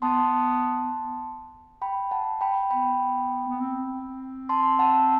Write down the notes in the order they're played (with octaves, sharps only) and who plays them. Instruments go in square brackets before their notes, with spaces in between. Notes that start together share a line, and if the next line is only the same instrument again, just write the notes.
[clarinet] B3 [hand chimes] A5 C6
[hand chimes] G5 B5
F#5 A5
G5 B5
[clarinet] B3 [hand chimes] G5 B5
[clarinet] B3
C4
[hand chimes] A5 C6
F#5 A5